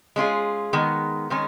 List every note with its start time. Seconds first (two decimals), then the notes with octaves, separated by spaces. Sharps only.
0.16 G#3 C#4 F4 G#4
0.73 D#3 G#3 B3
1.30 D#3 G#3 C#4